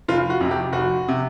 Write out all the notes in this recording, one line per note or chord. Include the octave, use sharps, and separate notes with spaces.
F1 F4
F#4
F2 C3
G4
F1 F#4
C3